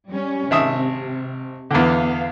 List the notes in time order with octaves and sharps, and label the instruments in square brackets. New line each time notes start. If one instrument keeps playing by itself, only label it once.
[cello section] G3 C#4
[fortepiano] G#1 E5 D#6 [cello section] C3
[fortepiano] E2 D3 [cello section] B3 F5